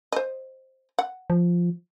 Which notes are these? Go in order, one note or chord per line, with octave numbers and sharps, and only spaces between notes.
C5 D#5
F#5
F3